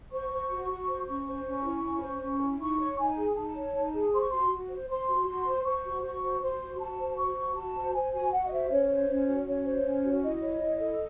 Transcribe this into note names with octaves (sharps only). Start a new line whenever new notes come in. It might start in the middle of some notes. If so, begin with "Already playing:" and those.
C5 C#6
C5
F#4
F#4
C5
C#4 C#6
C5
C#4
E4
C#4
C5
C#4
E4
D#4 C#6
C#5
D#4 G#5
G#4
D#4 A5
C#5
D#4
G#4
C5 C6
C#6
F#4 C6
F#4
C5
C5 C6
F#4
F#4
C5
C5 C#6
F#4
F#4 C#6
C5
C5 C6
F#4
F#4 A5
C5
C5 C#6
F#4
F#4 A5
C5
C5 G#5
F#4 G#5
F#4 F#5
D#5
C5 E5
C#4 C#5
C5
C#4
F#4
C#4 C#5
C5
C#4
F#4
E4 D#5
C#5
E4
A4